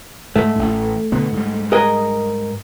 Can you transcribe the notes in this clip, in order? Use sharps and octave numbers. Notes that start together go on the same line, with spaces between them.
G#2 A3
A1
B2 D3 B3
G#2 G3
G#4 A#4 D#5